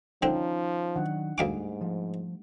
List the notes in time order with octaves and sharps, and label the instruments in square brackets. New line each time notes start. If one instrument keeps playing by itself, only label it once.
[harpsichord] D3 C4 [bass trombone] F3 [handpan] C#4 D#4
[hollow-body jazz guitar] D#3 F#3 [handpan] D4 F#5
[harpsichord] D2 F5 D6 [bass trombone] G#2 [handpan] G3 A3 [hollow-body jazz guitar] G#5
[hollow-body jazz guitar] F3